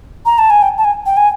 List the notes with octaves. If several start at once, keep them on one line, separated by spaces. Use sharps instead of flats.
A#5
A5
G#5
G5
A5
G#5
G5
G#5